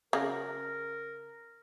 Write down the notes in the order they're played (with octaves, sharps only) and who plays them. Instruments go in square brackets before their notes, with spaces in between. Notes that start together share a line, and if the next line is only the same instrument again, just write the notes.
[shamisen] C#3 F#3 [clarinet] A#4